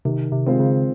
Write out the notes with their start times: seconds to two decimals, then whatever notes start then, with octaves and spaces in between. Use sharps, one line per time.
0.05 C3 D#3
0.32 C3
0.46 G#3 C4 F4 C5
0.60 C#3